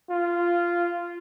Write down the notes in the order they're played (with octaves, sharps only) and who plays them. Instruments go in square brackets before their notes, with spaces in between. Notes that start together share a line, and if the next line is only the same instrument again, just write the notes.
[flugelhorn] F4